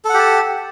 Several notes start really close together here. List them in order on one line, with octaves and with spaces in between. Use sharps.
A4 F#5 G4 A5